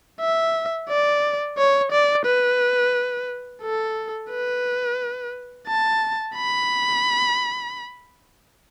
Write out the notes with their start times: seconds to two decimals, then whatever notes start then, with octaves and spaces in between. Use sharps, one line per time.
0.21 E5
0.89 D5
1.58 C#5
1.92 D5
2.26 B4
3.63 A4
4.31 B4
5.68 A5
6.36 B5